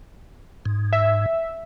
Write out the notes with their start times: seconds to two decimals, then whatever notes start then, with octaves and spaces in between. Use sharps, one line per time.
0.65 G#2
0.93 E5